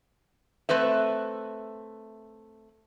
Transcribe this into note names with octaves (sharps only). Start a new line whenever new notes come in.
A3 C4 B4 E5